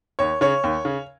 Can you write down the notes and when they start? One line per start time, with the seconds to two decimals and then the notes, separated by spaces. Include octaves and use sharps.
0.19 D#2 C#5
0.41 C#3 C#5
0.64 D#2
0.85 C#3